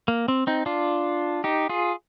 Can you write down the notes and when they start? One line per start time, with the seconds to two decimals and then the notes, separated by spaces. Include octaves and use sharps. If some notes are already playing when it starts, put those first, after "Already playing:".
0.08 A#3
0.28 C4
0.47 C4 D#4
0.66 D4 F4
1.44 D#4 G4
1.69 F4 G#4